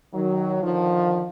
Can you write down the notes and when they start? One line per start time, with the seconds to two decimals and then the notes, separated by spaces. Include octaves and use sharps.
0.14 D#3 F#3
0.63 D3 D#3 F3